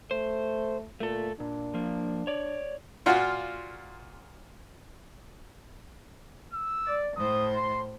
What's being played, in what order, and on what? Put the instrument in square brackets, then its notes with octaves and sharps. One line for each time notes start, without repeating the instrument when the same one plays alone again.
[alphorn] A3 [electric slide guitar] C5
[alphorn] A#2 [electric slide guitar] A3 A4
[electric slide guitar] A#2 [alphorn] D4
[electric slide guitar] F3 A#3
C#5 D5
[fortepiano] A#2 F4 F#4
[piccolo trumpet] E6
[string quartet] D5
[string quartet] A2 C5 [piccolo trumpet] D#6
[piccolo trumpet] C6